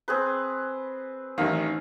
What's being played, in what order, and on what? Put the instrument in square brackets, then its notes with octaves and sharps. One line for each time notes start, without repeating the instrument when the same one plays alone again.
[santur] C4 G#4 B4
[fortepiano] A1 D#3 [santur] F5